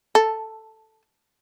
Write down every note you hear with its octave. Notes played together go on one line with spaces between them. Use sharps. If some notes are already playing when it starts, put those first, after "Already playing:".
A4